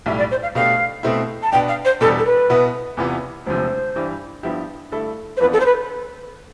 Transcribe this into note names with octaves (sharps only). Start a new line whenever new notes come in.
B1 A2 G3 E5
D5
C5
F5
B2 A3 D4 G4 F5
B2 A3 C4 E4
A5
B2 B3 D4 G5
F5
C5
E2 B2 G3 D4 A4
A4
B4
B2 B3 E4
E2 C3 E3 B3 F4
E1 D2 C3 F3 C5
G2 E3 G3
G2 F3 B3 E4 G4
G2 D3 A3 E4 A4
C5
F2 E3 B3 D4 F4 B4
A4
C5
B4